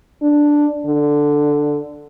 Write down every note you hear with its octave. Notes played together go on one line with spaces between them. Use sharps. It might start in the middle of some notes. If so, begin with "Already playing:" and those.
D4
D3